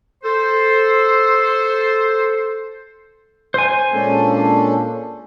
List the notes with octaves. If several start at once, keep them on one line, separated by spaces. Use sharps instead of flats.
A4 C5
C5 G#5
A#2 G#3 A#3 C#4 D4 A4